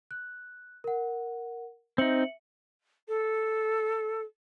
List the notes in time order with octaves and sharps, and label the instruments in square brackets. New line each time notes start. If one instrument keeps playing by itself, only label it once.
[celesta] F#6
A#4 F#5
[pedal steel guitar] C4 D#4 [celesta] E5 C#7 F#7
[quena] A4